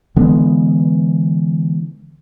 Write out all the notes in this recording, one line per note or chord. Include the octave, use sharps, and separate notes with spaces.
D3 E3 G#3 B3